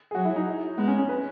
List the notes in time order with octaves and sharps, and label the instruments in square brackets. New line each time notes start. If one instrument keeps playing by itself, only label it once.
[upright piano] G#4
[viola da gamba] F#3 [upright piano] F#4
[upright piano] E4
D#4
[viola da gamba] G#3 [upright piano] B3
[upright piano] C#4
C#4
B4